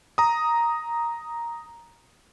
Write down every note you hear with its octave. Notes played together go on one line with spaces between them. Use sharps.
A#5 D#6